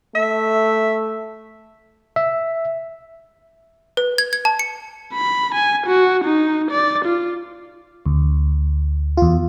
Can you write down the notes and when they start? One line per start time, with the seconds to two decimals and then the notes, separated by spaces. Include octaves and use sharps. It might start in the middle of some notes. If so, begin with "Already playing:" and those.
0.15 A3 E5
2.16 E5
3.97 B4
4.18 G#6
4.33 G#6
4.45 A5
4.59 C#7
5.14 B5
5.55 G#5
5.87 F#4
6.24 D#4
6.71 D5
7.05 F4
8.06 D2
9.17 E2 F4